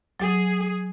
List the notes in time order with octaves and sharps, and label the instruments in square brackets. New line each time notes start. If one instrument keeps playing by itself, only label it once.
[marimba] F#3 [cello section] G#4